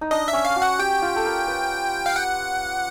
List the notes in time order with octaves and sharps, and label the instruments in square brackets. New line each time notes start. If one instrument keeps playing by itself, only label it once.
[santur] D#4
[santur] D4 [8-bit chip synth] D#5
[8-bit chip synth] E5
[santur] C#4
[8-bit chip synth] F5
[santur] F#4
[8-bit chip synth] F#5
[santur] G4 [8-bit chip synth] G5
[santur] F4
A4
A#4
B4
[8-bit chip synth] F5
F#5